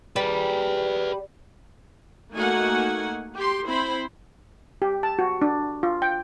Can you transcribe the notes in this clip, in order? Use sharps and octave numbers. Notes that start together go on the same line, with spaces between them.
G3 G#4 B4
A3 A#3 D#4 F#4 F#5 G#5
G4 C6
C4 E4 C5 B5
G4
A5
F#4
D4
F4
G5